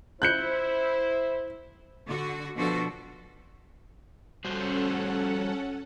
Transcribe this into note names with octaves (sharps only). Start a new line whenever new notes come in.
E4 C5 F#6 G6 C#7
D3 F#4
B2 F3 D4 F#4 A4
G3 C#4 F#4 A4 C5 F#5